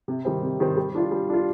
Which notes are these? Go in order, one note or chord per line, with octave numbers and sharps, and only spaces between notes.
C3
D#3 G3 C4
C3
D#3 G3 C4
G3
D4 F4
G3
D4 F4